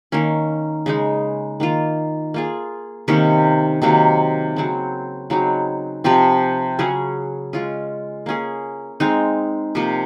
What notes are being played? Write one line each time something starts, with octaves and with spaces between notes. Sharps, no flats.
D#3 A#3 C#4
C#3 G#3 D#4
D#3 A#3 F4
A#3 F4 G#4
C3 D#3 A#3 C#4
C3 D#3 F#3 A#3
C#3 F#3 C4
C#3 F#3 C4 D#4
C3 F3 C4
C#3 F#3 C#4 G#4
G#3 C#4 F4
A#3 C#4 G#4
G#3 C4 D#4
C3 F3 A#3